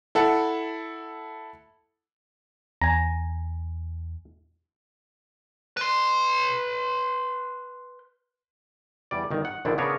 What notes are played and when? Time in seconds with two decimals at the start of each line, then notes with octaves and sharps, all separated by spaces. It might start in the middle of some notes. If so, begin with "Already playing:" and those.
0.15 E4 A4 F#5
2.82 E2 G#5 A#5
5.77 B4 C6
9.11 E2 G3 D5
9.30 G1 D#3
9.45 F#5
9.65 A#1 A#2 D3 D#3 D4 E4
9.78 C#3 B3 D4 G#4 A#4 C#5